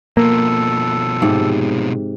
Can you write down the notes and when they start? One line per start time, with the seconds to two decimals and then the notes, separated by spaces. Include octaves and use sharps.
0.17 B2 F3 A#3 A4
1.22 G#2 C3